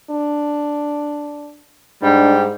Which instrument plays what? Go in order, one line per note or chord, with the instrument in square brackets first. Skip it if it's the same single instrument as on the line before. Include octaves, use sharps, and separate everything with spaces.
[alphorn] D4
[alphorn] G#2 [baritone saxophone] G3 [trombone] D4